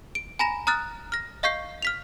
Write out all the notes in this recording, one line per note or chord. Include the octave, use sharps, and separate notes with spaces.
D7
G#5 A#5 B5 A#6 E7
A#5 D#6 F6 F#6 A6
F6 A#6
D#5 F5 C#6 G6 C7
F6 B6 F7